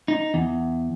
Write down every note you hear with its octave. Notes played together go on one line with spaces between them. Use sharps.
D#4
E2